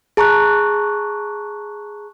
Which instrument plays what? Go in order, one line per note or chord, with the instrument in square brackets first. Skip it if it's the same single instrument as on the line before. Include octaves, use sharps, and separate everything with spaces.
[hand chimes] G#4 A5 A#5 C#6 F#6